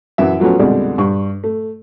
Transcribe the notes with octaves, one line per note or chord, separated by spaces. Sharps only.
F#2 E3 E5
F3 F#3 A3 B3 C#4
F2 B2 D3 G3 G#3 D4
G2 G3 C#6
A3